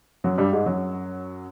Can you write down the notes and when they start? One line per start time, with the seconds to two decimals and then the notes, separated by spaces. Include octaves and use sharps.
0.24 F#2 F#3
0.38 G2 G3
0.53 G#2 G#3
0.66 F#2 F#3